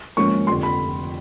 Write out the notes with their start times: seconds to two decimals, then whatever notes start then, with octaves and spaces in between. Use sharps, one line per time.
0.17 G#1 G#2 F3 A#3 C#4 C#6
0.47 F1 F2 D3 C6
0.63 B5